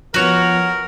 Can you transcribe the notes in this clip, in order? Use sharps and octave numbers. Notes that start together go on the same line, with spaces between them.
F3 B3 F#4 A#4 C#5